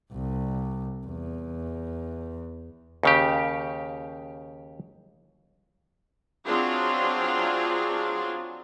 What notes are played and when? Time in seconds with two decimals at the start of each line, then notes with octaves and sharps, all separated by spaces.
0.12 C2
1.05 E2
3.03 D#2 C#3 G4
6.47 F#3 C4 D4 F4 G#4